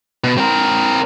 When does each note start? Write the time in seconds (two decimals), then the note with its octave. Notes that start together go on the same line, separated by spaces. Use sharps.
0.24 B2
0.38 C4 A#4